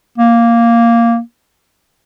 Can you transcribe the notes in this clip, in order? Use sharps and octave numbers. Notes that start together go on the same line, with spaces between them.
A#3